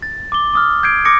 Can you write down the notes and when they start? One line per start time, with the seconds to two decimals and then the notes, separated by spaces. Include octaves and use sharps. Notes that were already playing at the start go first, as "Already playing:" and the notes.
0.02 A6
0.32 D6 G7
0.54 D6 D#6 F6
0.83 G6 G#6 C7 D7
1.05 D6 D#6 A#6 C#7